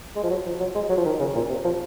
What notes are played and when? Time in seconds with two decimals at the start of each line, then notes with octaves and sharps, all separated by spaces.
0.16 G#3
0.23 F3
0.30 F#3
0.46 F3
0.60 F#3
0.75 G#3
0.89 F#3
0.97 F3
1.05 D#3
1.20 C#3
1.35 A#2
1.49 C3
1.64 F3